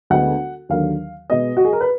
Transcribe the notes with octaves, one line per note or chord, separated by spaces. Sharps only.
D2 D3 G#3 B3 F#5
D#2 D3 F#3 A#3 F5
B2 G#3 B3 D#5
F#4
G#4
A#4
B4